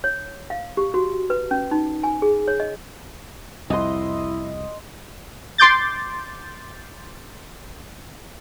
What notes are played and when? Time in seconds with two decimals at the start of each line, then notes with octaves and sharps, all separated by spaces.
0.04 C#5
0.50 F5
0.77 G4
0.94 F#4
1.30 B4
1.51 C#4
1.71 D#4
2.03 G#5
2.22 G#4
2.48 C#5
2.60 D#5
3.70 C2 F2 E4 D#5 C6
5.58 C6 D6 G6 A6